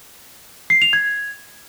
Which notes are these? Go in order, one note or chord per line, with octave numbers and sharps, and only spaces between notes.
C7
F7
G#6